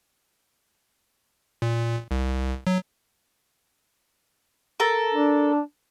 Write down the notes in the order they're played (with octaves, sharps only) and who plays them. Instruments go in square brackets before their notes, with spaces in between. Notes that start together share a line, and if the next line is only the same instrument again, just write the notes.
[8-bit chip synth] A#2
C2
F#3
[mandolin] A4 A#4
[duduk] D4